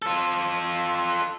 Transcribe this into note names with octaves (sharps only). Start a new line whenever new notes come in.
F4 A4